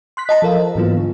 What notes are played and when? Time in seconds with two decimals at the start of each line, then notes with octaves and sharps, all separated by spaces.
0.17 C6 F#6 B6
0.29 D#5 A5 A#5
0.42 F3 A4 A#4 F5
0.60 C5
0.75 G#2 E3 F#3 A#3 B3 F4
0.98 D3